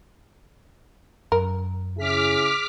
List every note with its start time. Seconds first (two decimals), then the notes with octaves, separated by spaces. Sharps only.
1.32 F#2 A#4
1.97 C#3 E4 G#4 D6 F6 B6